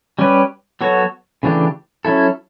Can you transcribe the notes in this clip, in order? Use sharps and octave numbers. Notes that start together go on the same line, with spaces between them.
G3 C#4 G4 B4
F#3 B3 F#4 A4 C#5
C#3 E3 A3 D4 G4
F#3 C#4 E4 A4